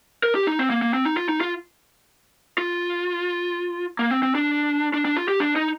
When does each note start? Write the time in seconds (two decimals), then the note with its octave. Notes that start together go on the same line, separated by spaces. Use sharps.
0.23 A#4
0.35 G4
0.47 D#4
0.59 C4
0.70 A#3
0.82 A#3
0.94 C4
1.05 D#4
1.17 F4
1.29 D#4
1.41 F4
2.58 F4
3.99 A#3
4.11 C4
4.23 C4
4.35 D4
4.94 D4
5.05 D4
5.17 F4
5.28 G4
5.40 D4
5.56 D#4